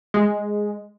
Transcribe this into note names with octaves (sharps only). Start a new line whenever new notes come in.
G#3